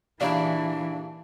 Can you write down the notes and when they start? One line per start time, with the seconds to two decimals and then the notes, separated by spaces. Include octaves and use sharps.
0.21 D#2 A#2 C#3 E3 D4 E4 D5